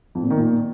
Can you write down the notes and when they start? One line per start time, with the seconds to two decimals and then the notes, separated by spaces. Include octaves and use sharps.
0.15 F2
0.23 A#2
0.30 D#3
0.38 A#2